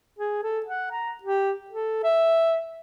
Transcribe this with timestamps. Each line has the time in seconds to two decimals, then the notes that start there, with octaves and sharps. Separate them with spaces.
0.19 G#4
0.43 A4
0.66 F#5
0.91 A#5
1.23 G4
1.70 A4
2.04 E5